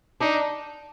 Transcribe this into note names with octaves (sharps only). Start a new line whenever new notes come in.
D4 D#4